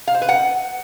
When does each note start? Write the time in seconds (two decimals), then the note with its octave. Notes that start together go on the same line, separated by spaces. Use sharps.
0.07 F5
0.15 C5
0.22 B4
0.29 F#5